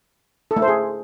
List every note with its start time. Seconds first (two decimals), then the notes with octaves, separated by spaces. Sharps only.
0.51 A4
0.56 A3
0.62 C5
0.68 G#4